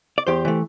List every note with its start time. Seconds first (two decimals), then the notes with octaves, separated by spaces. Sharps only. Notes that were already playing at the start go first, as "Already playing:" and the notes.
0.18 D5
0.27 E2 G4 C5
0.45 E3 A3